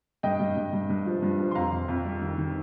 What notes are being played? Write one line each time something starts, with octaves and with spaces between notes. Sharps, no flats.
G2 D#5 G5
G2
G2
G2
G2
F3
G2
F3
C6
F2 F5 A#5
F2
F2
G3
D#3
D#3